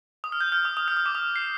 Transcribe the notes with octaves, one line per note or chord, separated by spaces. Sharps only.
D#6
F6
G6
F6
D#6
D#6
F6
D#6
D6
D#6
C7